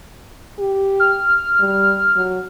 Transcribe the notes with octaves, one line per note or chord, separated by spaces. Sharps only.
G4
F6
G3
F#3